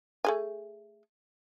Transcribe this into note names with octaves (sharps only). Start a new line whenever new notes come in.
A3 G#4 G#5